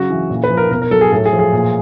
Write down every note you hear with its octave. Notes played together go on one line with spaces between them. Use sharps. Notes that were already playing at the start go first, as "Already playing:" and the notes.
Already playing: C#3 F#3 F#4
E3
A#2
B4
F3
A#4
B2 A#4
A#4
F#3 A4
G#4
A2 A4
G#4
F3
G#4
A#2